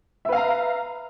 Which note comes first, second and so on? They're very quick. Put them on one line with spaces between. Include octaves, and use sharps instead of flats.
E5 B4 F5 A#5